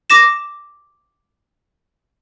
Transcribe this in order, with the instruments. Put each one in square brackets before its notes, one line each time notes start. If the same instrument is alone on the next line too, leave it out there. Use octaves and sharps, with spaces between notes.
[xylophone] D6 A#6 E7